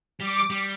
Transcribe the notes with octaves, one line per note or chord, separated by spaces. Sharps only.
G3 D6
G3